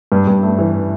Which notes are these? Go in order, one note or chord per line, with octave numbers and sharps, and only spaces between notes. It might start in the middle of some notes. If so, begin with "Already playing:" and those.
G2
G2
A3
E3